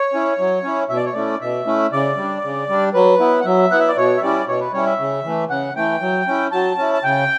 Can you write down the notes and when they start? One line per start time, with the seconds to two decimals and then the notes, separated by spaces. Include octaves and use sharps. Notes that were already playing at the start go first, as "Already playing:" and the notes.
Already playing: C#5
0.13 C#4 E4
0.39 F#3
0.63 C#4 E4
0.89 B2 E5
0.97 D5
1.06 C#5
1.13 A3 C#4 E4 D5
1.41 B2 E5
1.66 A3 C#4 E4
1.92 C#3 D5
2.17 G3 D4
2.44 C#3
2.69 G3 D4
2.94 F#3 B4
3.20 B3 E4
3.41 F#5
3.45 F#3 E5
3.71 B3 E4 F#5
3.80 E5
3.88 D5
3.97 B2 C#5
4.17 E5
4.22 G3 C#4 E4 D5
4.47 B2 C#5
4.60 B4
4.73 G3 C#4 E4 C#5
4.86 E5
4.99 C#3
5.24 E3 A3
5.50 C#3 F#5
5.76 E3 A3 G5
6.02 F#3
6.27 C#4 E4
6.52 F#3 A5
6.78 C#4 E4
6.94 A5
7.04 C#3 G5